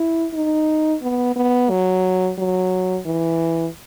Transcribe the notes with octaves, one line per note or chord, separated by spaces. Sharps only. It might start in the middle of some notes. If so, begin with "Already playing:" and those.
Already playing: E4
D#4
B3
B3
F#3
F#3
E3